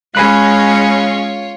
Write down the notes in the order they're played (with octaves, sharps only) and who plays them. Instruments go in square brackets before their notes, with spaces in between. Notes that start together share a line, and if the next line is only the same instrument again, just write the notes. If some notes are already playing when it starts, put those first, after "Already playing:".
[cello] G#3 C#4 [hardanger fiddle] F4 C#5 [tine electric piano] G#5 B5 F#6